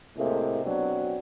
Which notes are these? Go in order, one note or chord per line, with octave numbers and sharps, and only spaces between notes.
A2 C3 G#3 A#3
B2 F#3 C4 D4